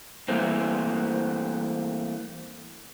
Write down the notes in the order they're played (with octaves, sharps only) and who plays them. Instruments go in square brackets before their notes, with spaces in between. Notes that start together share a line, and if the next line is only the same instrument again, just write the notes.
[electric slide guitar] E3 G3 A3 A#3 C4